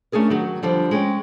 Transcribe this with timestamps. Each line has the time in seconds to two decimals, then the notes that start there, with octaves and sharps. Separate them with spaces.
0.12 A3 C#4 D4 G#4 A#4
0.30 D#3 F#3
0.63 D3 F3 G3
0.91 G#3 C#4 G5